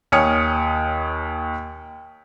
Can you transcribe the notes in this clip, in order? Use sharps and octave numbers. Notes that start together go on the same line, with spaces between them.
D#2 C#5 G#5 D#6 F6 C#7